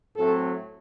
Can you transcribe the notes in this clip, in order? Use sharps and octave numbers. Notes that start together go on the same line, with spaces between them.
A2 F#3 A3 C4 A4